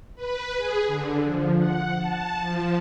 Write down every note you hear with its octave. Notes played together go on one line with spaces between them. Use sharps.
B4
G#4
D3
F3
F#5
A5
F3